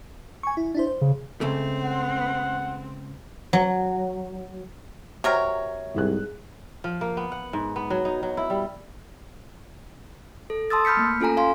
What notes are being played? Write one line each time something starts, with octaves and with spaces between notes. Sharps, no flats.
G#5 C#6
E4
D4 E4 C5
C5
C#3
C#2 C#3 A3 C4
F#5
F#3
C3 F#3 A#4 C#5
C2 G#2 G#4 F#6
F3
A#3
B3
F#5
G#2
B3
F#3
D#4
F#3
E4
G3
A4
A5 C6 D#6 E6 A6
B5 F6 G6 B6 C#7
A3 A#3
C#4 F4 A4 G#5 A#5
F5 G#5 C6